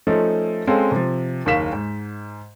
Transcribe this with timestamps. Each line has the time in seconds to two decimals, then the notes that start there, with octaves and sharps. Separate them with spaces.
0.07 F3 A3 C#4 D#4 A4
0.67 G#3 C4 C#4 A4 F5
0.92 C3 F3
1.46 F#1 D#2 A#4 F5 B6 E7
1.73 G#2